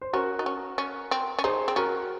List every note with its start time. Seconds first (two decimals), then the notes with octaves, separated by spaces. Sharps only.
0.02 C5
0.13 C#4 F#4 A#4
0.39 D#4
0.46 C#4
0.78 C#4
1.11 C4
1.39 C#4
1.44 D#4 G#4 C5
1.68 C4
1.76 C#4 F#4 A#4